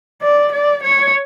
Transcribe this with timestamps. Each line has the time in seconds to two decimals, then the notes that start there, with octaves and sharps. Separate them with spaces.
0.22 D5
0.52 D5
0.83 C#5